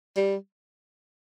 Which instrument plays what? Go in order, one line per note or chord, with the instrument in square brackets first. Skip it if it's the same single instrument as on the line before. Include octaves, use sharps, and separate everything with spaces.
[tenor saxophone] G3